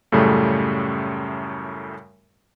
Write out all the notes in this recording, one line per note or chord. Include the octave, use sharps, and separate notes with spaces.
F#2 A2 C#3 G3 A3